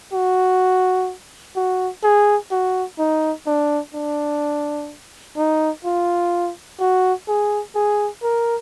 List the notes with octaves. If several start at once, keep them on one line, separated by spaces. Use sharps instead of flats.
F#4
F#4
G#4
F#4
D#4
D4
D4
D#4
F4
F#4
G#4
G#4
A#4